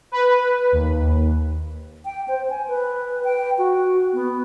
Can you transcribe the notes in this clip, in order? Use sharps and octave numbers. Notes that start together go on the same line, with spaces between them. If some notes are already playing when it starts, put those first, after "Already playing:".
B4
D#2
G5
C5
G#5
B4
G5
F#4
B3